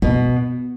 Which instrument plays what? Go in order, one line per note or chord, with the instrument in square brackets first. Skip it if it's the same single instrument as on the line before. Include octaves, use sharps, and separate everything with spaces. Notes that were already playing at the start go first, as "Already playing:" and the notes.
[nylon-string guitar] B2 [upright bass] B3